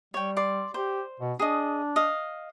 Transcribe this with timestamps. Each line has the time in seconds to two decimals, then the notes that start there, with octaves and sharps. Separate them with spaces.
0.14 G3 C#5 G5
0.37 D5 C6
0.74 G4 C5
1.20 B2
1.39 D4 G#4 D#5
1.96 D#5 F5